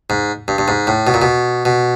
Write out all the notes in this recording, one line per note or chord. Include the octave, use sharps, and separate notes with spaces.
G#2
G2
G2
G#2
A2
B2
A#2
B2
B2